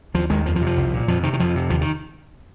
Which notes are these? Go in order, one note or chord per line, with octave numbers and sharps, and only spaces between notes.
D#2 F3
D#2 D#3 G#3
F2 F3
F3
C3
F3
C2
A#2
F2 F3
C3 D#3
D#3
F2 F3
C3
D#2 F3
D#3